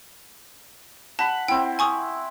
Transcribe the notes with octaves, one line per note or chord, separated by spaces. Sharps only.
F#5 A5 B5
C4 E4 G5
G#5 C#6 D#6